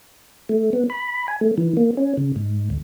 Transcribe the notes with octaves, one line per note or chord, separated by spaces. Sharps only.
A3
B3
B5
G#5
A3
E3
A#3
C#4
C#3
G#2
D2